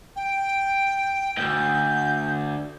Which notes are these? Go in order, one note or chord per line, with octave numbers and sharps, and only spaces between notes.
G5
D2 G#2 G6